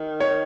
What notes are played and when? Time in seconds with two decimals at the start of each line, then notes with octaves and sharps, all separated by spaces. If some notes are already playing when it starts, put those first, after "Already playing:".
Already playing: D#3
0.20 C#5